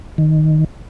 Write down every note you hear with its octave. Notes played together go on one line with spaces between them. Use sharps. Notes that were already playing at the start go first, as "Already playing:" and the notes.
D#3